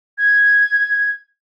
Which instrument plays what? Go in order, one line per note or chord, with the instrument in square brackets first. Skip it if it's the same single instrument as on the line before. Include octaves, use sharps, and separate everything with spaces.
[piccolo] G#6